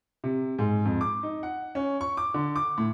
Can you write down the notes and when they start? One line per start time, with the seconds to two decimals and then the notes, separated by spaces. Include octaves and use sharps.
0.24 C3
0.59 G#2
0.85 F2
1.01 D6
1.23 D#4
1.43 F#5
1.75 C#4
2.01 C#6
2.17 D6
2.34 D3
2.56 D6
2.78 A2